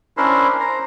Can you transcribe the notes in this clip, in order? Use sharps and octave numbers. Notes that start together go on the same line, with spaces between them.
C#4 D4 E4 A#4 C5
C5 A#5